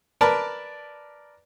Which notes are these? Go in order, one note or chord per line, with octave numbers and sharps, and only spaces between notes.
A#4 B4 D5 A5 B5